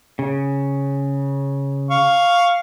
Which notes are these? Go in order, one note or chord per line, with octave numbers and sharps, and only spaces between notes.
C#3
F5 C#6